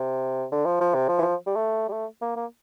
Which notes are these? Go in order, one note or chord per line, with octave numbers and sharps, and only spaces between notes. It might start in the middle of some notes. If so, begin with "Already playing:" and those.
Already playing: C3
D3
F3
F3
C3
F3
E3
F3
G3
A3
G3
A3
A#3
A#3